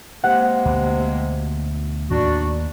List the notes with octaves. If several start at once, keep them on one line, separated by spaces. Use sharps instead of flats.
C3 G#3 A#3 F#5
D2 B2 D3
D#2 A2 D4 F#4